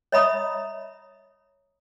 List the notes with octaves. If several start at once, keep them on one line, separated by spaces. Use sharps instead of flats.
C#5 D#5 E5 A#5 B5 D#6